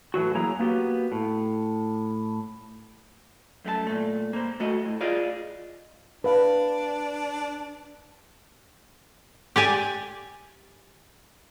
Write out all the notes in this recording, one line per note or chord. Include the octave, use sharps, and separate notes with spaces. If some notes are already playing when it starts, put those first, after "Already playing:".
A2 E3 F#3 F#4
F#3 A#3 E4 G#4 C#5 A#5
A#3 B3 F#4 G4
A2
F#2 A3 G4 A5
A#2 A3
A#3 C5
A3 F#4 D#5
A2
F4 G#4 D5 D#5 F5
D4 B4 F5
G4 D5 G#5